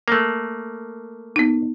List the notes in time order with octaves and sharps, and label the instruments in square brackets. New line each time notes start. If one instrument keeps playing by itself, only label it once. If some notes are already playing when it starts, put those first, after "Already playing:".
[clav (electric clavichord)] A3 A#3
[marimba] B3 D#4